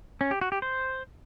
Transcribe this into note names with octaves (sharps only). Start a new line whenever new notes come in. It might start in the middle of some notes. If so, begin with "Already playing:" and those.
C#4
G4
F#4
G4
C5